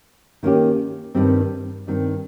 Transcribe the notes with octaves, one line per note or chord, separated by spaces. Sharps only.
D#3 A#3 C#4 G4
G2 D#3 G3 C4
G2 D#3 G3 C4